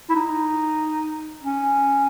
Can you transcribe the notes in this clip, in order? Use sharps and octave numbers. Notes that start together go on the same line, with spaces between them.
E4
D#4
C#4